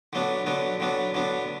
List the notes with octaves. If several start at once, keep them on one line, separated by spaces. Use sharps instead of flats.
D3 F#3 B3 D4
D3 F#3 B3 D4
D3 F#3 B3 D4
D3 F#3 B3 D4